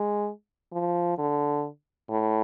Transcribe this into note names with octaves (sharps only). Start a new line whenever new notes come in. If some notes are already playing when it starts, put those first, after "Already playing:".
Already playing: G#3
F3
D3
A2